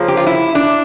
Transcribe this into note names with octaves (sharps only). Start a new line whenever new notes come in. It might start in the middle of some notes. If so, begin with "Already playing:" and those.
Already playing: C#3 F3 A#3
G4
F4
E4
D4